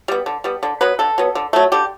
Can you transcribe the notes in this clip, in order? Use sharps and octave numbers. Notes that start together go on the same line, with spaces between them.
G3 B3
D3
G3 B3
D3
F#3 B3 B4
D3 A4
F#3 B3
D3
F#3 A3
D3 G4